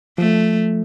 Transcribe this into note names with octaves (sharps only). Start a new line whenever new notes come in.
F3 A3